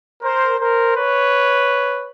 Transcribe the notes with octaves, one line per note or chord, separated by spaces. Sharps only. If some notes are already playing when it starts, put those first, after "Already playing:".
A#4 C5
A#4 C5
B4 C#5